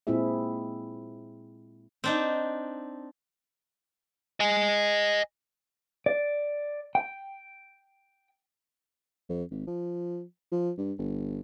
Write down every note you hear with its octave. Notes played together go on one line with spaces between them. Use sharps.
A#2 G#3 C4 E4 G#4 E5
C4 D4 D#4
D#5 G#5
D5
G5
F2
G#1
F3
F3
G2
G1